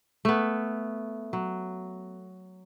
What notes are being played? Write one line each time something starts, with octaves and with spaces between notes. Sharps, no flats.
A3 B3
F#3